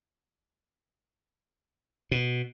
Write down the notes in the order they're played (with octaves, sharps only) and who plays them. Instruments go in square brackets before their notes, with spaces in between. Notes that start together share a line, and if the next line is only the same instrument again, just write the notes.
[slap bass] B2